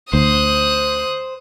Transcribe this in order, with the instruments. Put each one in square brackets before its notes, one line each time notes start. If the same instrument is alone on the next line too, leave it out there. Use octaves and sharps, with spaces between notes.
[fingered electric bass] D2 [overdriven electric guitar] C5 [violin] D#6 F#6